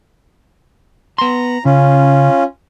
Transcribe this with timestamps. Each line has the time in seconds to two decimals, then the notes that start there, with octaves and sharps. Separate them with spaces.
1.18 B3 A#5 C6
1.65 C#3 C#4 F4